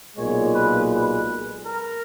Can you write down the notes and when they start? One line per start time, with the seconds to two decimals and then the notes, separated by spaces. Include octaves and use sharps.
0.17 B1 A#2 G#3 C#5
0.54 B4
0.91 B4
1.66 A#4